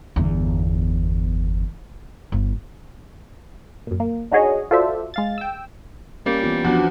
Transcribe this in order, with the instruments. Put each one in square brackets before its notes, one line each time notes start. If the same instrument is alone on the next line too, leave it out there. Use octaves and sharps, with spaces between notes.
[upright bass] G1 E2
G1
[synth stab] F#2 A#2
A#3
D4 D#4 F#4 G#4 C#5 D#5
F4 F#4 A4 C5 D5 E5
G#3 F5 A6
G5 E6
[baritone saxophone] G3 [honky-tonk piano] A#3 [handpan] C#4
[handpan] E3 B3 F4
[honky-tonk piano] E2 [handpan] F3 [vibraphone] D4 F#4 F#5